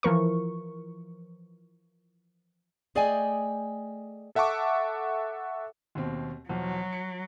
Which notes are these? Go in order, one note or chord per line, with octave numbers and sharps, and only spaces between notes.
E3 F3 A#4 C#6
A3 G#4 D5 D#5 G5 G#5
A4 E5 F#5 A5 C#6 D6
D#2 B2 C4
E2 B2 F3 F#3
C#7